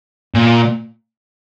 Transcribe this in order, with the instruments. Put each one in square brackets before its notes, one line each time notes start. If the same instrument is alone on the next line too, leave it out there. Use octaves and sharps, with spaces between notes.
[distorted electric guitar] A#2